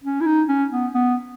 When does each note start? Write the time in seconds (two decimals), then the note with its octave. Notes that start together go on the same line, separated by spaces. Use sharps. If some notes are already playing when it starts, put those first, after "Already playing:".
0.04 C#4
0.21 E4
0.26 D#4
0.48 C#4
0.71 B3
0.94 B3